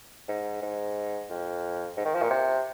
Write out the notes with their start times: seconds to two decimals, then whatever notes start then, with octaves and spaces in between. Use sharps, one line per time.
0.29 G#2
0.62 G#2
1.30 F2
1.97 G#2
2.05 D#3
2.15 F3
2.22 A#2
2.30 C3